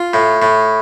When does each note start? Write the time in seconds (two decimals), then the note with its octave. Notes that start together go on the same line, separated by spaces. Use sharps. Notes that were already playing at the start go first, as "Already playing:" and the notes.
Already playing: F4
0.14 A2
0.42 A2